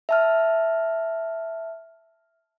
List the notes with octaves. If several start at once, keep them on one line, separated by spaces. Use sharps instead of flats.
E5 A5 F6